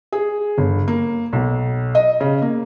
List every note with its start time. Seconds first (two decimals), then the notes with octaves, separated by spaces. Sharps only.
0.12 G#4
0.58 G1
0.88 A#3
1.33 B1
1.95 D#5
2.21 C#3
2.42 A#3